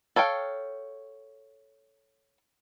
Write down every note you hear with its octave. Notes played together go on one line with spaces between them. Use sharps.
A4 C#5 F5 G5